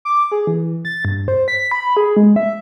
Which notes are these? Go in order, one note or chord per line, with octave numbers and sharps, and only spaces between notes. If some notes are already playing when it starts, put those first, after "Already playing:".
D6
G#4
E3
A6
G2
C5
B6
B5
G#4
G#3
E5